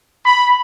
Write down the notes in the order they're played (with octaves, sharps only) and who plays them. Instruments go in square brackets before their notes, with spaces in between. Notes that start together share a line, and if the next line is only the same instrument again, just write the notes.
[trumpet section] B5